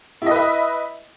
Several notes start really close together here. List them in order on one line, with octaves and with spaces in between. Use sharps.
E4 D#5 B4 E5